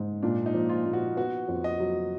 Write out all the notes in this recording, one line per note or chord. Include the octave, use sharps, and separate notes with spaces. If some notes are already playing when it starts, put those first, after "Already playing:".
Already playing: G#2
A#2 D4
D#4
F3
F4
A#2
F#4
B3 F#4
F2
D#5
F#3